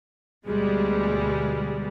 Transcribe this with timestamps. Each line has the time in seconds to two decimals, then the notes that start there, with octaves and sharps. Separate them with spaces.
0.46 D2 B2 G3 G#3